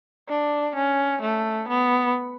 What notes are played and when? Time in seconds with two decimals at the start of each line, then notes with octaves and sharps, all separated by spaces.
0.29 D4
0.76 C#4
1.22 A3
1.68 B3